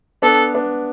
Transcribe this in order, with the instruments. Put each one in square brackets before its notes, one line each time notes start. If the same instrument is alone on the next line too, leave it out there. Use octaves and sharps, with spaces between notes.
[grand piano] B3 D4 [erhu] A4
[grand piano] B3 D4